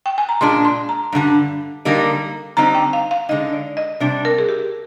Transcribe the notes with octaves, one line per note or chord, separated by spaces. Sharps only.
G5
G#5
A#5
A#2 G#3 D4 C6
C6
A#5
G2 D3 G3
D3 G3 A#3 D#4
D3 G3 C4 D#4 A#5
G5
F5
F5
D3 G#3 D#4 D#5
D5
D#5
C3 G3 D4 D5
A#4
G#4
G4